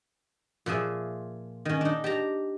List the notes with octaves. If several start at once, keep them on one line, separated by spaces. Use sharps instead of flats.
A#2 F3 G#4 E5
D#3 C#4
D4 D#4
G4 A5 A#5